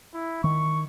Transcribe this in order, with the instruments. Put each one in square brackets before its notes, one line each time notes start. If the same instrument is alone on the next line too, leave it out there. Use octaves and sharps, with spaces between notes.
[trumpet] E4
[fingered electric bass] D#3 [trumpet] C#6